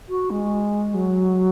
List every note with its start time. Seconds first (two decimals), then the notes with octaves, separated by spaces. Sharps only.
0.09 F#4
0.30 G#3
0.94 F#3